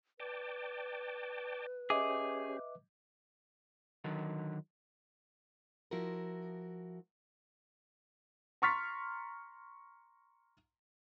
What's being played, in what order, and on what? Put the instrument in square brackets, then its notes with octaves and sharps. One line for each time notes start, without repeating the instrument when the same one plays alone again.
[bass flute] B4 [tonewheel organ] D5 G5 A5
[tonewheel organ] C#4 G4 [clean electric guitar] G#4 [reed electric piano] D#5 E5 D6
[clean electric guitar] D3 D#3 F#3
[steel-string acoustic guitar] F3 E4 F#4 A#4
[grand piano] A#5 C6 C#6 F6 A6 B6